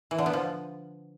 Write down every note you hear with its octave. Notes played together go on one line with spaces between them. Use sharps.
E3
D3
B3
F3